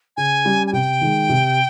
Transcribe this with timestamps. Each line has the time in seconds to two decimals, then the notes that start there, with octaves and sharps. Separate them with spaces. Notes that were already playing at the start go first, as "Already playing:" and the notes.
0.17 C#3 G#5
0.45 G3 C#4 G4
0.67 G#5
0.73 C3 G5
1.01 D#3 G#3
1.29 C3